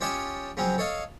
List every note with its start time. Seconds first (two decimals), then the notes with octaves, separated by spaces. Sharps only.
0.01 C#4 F4 G4 C#5 D#5 A5
0.57 C#3 F3 F#3 C4 C#4
0.78 A4 C#5 D#5 F5